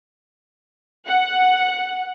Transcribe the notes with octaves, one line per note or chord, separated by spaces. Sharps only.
F#5